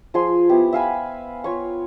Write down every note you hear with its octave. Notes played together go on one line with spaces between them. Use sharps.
F3 F4 G#4 C6
B3 E4 G4
E5 F5 G#5 B5
F4 C#5 C#6